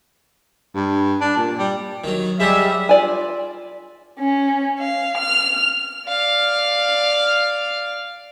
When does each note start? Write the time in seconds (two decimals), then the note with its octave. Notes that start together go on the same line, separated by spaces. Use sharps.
0.75 G2
1.21 D4
1.37 A#2
1.58 G3
2.04 D#3 F#3
2.40 G3 G#3 C#5 E5 F#5
2.89 F4 D5 G#5
4.19 C#4
4.79 F5
5.17 F6
6.08 D5 F5